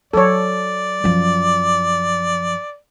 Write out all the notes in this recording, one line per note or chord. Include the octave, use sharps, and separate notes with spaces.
F#3 A4 C#5 D5
F#2 F3